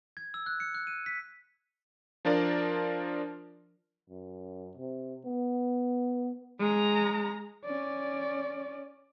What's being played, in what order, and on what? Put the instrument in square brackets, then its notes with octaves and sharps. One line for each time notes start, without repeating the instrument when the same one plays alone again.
[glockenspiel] G#6
E6
F#6
C#7
F#6
D#7
B6
[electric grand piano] F3 D4 F4 A#4 D5
[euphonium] F#2
C3
B3
[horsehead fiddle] G#3 A#5
C#4 D5